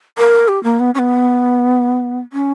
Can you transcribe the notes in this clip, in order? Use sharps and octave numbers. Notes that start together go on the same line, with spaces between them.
A#4
G4
A#3
B3
C#4
B3
C#4